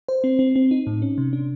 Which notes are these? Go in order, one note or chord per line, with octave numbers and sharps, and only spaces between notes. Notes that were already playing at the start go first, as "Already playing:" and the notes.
C5
C4
C4
C4
D#4
A2
C#4
C3
D4